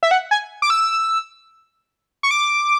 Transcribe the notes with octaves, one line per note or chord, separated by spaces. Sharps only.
E5
F#5
G#5
D6
E6
C#6
D6